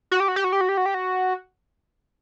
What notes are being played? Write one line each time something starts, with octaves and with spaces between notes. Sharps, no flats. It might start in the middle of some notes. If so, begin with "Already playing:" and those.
F#4
G4
F#4
G4
F#4
G4
F#4
G4
F#4
G4
F#4